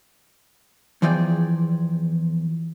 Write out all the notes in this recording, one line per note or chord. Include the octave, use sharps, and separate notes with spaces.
E2 E3 F3 G#4 D5 G5